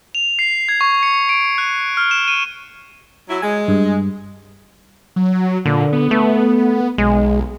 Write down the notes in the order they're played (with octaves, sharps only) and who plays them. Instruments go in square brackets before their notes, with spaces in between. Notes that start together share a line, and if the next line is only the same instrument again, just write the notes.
[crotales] F7
C7
G#6
C#6
C#7
D7
F#6
F6
E7
D#7
[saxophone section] F#3 E4
[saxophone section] G#3 [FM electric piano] G#5
[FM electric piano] G2
[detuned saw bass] F#3
[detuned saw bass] A#2 [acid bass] D3
[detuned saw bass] B3
[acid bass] A3
[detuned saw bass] B1 [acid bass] G#3